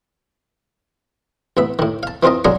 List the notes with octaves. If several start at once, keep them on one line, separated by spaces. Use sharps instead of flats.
A1 B3 E5
A2 D#3
F5 A5
E3 C4 F4 A#4 D#5
F#3 G#3 D4 G#4 A#4 F5